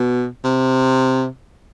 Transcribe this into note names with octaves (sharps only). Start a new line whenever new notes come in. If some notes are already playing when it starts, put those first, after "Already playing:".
Already playing: B2
C3